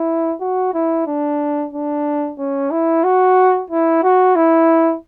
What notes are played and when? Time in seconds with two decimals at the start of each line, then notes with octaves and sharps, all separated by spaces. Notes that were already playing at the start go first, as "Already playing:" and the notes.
Already playing: E4
0.40 F#4
0.74 E4
1.07 D4
1.73 D4
2.39 C#4
2.71 E4
3.04 F#4
3.70 E4
4.03 F#4
4.36 E4